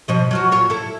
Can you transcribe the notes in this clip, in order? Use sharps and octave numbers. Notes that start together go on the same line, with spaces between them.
B2 F3 D#5
F#3 F4 F#4
A#2 F4 C#5
E4 A4